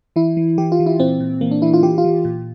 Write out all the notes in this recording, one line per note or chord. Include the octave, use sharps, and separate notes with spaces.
E3 E4
E3
E3 G4
F4
E3
E4
A#2 C4
A#2
E3 A#3
D4
E3 E4
F4
E3 G4
F4
E3
A#2